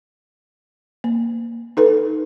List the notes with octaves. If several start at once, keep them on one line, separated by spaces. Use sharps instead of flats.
A#3
D#4 A4 B4